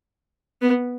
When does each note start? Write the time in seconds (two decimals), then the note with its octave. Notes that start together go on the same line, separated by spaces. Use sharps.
0.62 B3